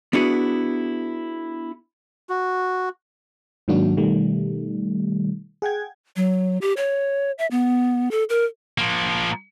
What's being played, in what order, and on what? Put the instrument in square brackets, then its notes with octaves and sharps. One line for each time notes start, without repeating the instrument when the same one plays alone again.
[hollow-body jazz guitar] B3 D4 E4 F#4 G#4
[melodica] F#4
[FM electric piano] G#2 D#3 F#3 A#3 D4 F#4
B2 D#3 G3 A3
G#4 F#5 G5 G#6
[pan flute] F#3
G4
C#5
E5
B3
A4
A#4
[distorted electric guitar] F3 A#3